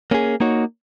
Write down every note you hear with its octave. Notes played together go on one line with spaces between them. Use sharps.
A#3 C#4 G#4
A#3 D#4 F#4 C#5